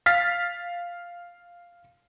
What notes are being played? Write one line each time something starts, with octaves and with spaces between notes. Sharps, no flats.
F5 F6 A6 B6